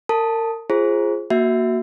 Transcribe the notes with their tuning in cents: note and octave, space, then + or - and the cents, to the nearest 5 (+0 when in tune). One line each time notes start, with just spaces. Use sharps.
A#4 -35 A5 +0
F4 -20 G#4 +0 C5 +20
A#3 +0 F#4 +0 E5 +0